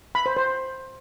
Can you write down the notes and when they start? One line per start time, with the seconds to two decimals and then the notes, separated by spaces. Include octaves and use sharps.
0.15 B5
0.26 C5
0.36 C5